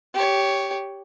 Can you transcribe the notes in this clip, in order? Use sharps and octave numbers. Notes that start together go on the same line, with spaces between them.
G4 C#5